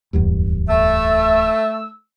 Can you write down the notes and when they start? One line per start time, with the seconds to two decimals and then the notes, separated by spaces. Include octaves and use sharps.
0.13 D1 E2 G2
0.68 A3 E6